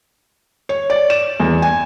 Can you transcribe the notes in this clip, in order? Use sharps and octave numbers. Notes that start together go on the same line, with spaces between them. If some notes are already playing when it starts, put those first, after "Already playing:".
C#5
D5
E7
E2
G#5